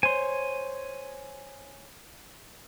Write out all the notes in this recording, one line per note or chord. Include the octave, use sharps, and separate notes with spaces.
C5 C#5 G#5 C6